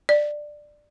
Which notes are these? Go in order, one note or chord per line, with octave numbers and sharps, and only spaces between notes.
D5